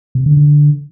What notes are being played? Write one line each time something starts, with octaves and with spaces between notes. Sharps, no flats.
C3
D3
D3